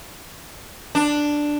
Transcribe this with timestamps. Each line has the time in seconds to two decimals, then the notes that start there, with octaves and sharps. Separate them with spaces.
0.95 D4